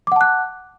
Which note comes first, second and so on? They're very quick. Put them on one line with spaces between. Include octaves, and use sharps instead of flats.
D6 F#5 A5 F#6